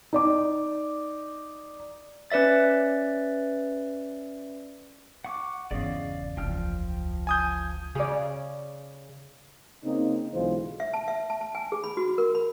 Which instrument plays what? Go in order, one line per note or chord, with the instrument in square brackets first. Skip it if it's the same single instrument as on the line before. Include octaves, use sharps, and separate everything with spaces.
[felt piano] D#4 D5 D6
[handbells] C#4 B4 D5 E5 A6
[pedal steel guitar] F#5 C#6 D6
[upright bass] G1 [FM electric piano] E2 C#3 [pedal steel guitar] D5 D#5 F5
[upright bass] F#1 C#2 [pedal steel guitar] F3 G5 F6
[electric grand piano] G#5 D#6 G6
[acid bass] C#3 [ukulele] G#4 D5
[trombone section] C#3 A#3 C4 D#4
B1 D3 E3 G#3 F4 C5
[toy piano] E5
A5
E5
A5
A5
G#5
G#4
B5
F#4
A#4
B5